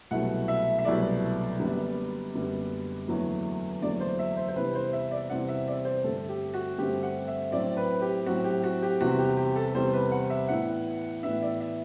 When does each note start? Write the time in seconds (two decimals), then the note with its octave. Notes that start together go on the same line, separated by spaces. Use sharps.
0.11 C2 B2 F#3 A3 E4 F#5
0.48 E5
0.79 E5
0.85 C2 B2 F#3 A3 E4 D5
1.60 F#1 F#2 D3 G3 B3
2.33 F#1 F#2 D3 G3 B3
3.07 F#1 E2 D3 F#3 A3
3.82 F#1 E2 D3 F#3 A3 D5
4.00 C5
4.19 E5
4.37 C5
4.48 C5
4.56 E2 C3 G3 C4 E4 B4
4.75 C5
4.93 E5
5.11 D5
5.30 E2 C3 G3 C4 E4 F#5
5.48 E5
5.67 D5
5.85 C5
6.04 G2 D3 A3 C4 A4
6.29 G4
6.54 F#4
6.78 G2 D3 A3 C4 G4
7.03 F#5
7.28 E5
7.52 A2 F#3 C4 D5
7.77 B4
8.02 G4
8.26 A2 F#3 C4 F#4
8.45 G4
8.63 F#4
8.82 G4
9.00 E2 C3 G3 C4 F#4
9.19 G4
9.37 G4
9.56 A4
9.74 E2 C3 G3 C4 C5
9.93 B4
10.12 F#5
10.30 E5
10.48 A2 E3 B3 D4 F#5
11.23 A2 E3 B3 D4 E5
11.42 D5
11.60 E5